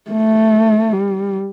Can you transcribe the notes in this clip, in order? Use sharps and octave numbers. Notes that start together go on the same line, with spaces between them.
A3
G3